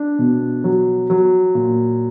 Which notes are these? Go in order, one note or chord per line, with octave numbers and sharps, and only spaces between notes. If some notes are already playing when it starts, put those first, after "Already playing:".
Already playing: D4
B2
F#3
F#3
A#2